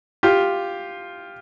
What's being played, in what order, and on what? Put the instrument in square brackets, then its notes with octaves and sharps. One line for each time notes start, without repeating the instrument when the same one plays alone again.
[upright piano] F4 G4